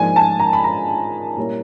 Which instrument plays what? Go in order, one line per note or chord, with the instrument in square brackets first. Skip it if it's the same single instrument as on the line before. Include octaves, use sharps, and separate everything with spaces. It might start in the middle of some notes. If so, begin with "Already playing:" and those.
Already playing: [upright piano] G#2 F3 A#3 D4 G#5
A5
A#5
B5
A#5
A#2 G3 A#3 C#4 E4